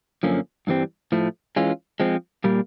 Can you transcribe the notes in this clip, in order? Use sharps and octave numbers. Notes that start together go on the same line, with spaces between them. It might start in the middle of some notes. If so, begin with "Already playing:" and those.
F#2 D3 F3 A#3 C#4
G2 E3 G3 C4
A2 F3 A3
E3 G#3 C#4 F4
F3 G#3 C4
A#2 G3 A#3